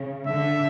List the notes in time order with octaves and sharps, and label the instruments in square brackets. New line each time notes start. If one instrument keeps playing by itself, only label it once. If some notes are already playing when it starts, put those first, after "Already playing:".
Already playing: [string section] C#3
[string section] D3 [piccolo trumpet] E5